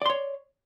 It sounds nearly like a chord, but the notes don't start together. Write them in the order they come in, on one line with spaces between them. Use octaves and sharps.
D5 C6 C#5